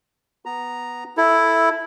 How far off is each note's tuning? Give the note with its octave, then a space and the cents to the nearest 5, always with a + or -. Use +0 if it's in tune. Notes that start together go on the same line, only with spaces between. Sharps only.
B3 +0 A#5 +0
E4 +0 A4 +0